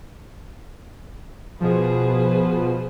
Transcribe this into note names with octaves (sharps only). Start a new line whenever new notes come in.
B2 F3 G#4 B4 C5